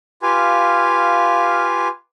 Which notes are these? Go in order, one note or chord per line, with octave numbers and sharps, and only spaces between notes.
F4 G4 B4 F5 G#5